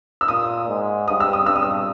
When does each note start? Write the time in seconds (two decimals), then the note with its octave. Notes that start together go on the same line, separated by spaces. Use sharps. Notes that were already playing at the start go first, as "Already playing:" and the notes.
0.21 E6
0.28 A#2 D#6
0.68 G#2
1.08 G2 D#6
1.20 E6
1.33 D#6
1.46 G2 E6
1.56 D#6
1.63 E6